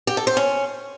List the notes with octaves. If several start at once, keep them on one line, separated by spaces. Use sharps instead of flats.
G4
A4
C5
C#4